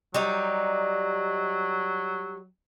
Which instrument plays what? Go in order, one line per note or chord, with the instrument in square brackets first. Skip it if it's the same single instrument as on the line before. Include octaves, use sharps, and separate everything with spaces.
[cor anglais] F#3 [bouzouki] G3 D#4